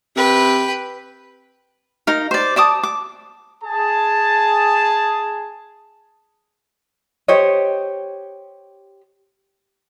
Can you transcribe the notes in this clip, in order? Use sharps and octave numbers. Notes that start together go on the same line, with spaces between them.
C3 B4 G5
D#4 A#4 F5
C5 D5
D5 A5 D6 D#6
D6
G#4 A5
G4 C5 C#5 D#5